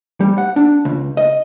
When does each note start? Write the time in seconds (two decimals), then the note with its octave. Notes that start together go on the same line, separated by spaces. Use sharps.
0.20 G3
0.38 F#5
0.56 D4
0.85 C#2
1.17 D#5